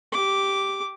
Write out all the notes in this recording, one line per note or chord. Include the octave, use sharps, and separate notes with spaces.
G4 D6